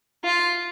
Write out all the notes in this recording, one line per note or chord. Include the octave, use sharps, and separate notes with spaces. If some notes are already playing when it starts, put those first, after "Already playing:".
F4